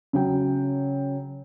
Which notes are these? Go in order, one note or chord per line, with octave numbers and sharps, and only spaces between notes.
C#3 F#3 G5